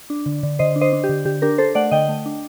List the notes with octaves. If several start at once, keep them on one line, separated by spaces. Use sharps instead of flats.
D4
D3
D3
D3 C5 D#5
D4
C5 D#5
D4
G4
D3
D3 G4
D4 G4 A#4
D4 A4 C5
A3 D5 F#5
D3 D#5 G5
A3
D4